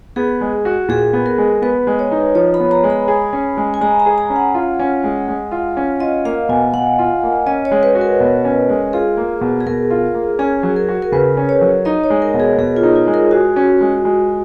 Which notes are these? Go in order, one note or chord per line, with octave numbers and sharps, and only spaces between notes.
B3 G#4
G#3
F#4
A#2 G#4
B3
A#4
G#3
B3 B4
G#3
C#5
D#4
F3 C#5
B5
B3
A#5
G#3
B5
G#4
C#4
G#3
G#5
G#3 A#5
A#5
G#4
A#5
C#4
F#5
F4
C#4
G#3
G#3
F4
C#4
F4 D#5
A#3 F5
B2 G#5
B2 F#5
F4
A#3
C#4 D#5
C#5
G#3
B4
F#4
A#4
B2
C#4
G#3
F4 G#4
A#3
B2
G#4
B2 A#4
F4
A#3
C#4 G#4
F#3
A#4
F#4
A#4
C#3 B4
C#4
C#5
F#3
D#4 D#5
C#5
G#3
A#4
B2
G#4
B2 G#4
F4
D#4
F4
G#3
A#4
F#4 G#4
C#4
G#3
G#3